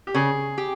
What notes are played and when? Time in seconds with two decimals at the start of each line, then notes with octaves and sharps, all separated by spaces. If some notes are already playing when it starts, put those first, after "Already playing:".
0.07 G4
0.14 C#3 G#4
0.58 G4